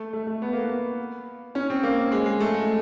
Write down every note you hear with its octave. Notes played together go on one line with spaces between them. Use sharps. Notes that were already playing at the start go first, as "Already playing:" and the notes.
Already playing: A3
A3
A3
B3
A#3
B3
C#4
C4
A#3
G#3
G#3
A3